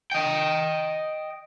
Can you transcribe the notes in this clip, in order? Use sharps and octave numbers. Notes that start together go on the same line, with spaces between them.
D#5 G5